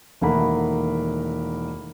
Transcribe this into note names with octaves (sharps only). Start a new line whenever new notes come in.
E1 D#3 A3 A#3 F#5 B5